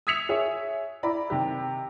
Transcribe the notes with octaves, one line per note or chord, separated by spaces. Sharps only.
D#6 E6 G#6 B6 C#7 F7
G#4 C#5 E5 D#6
E4 D5 A#5 B5
C3 D#3 G4